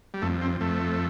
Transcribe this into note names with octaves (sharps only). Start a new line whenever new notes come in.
G3
F2 A3
C4
F2 A3